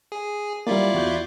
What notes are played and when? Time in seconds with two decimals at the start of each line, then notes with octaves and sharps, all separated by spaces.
0.12 G#4
0.67 G3 A#3 E4 F4 D5
0.94 E2 F#4 G6